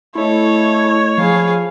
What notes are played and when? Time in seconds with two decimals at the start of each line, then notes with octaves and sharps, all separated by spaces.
0.15 A3 E4 A4 C#5 D#5
1.18 F3 G#4 F5 B5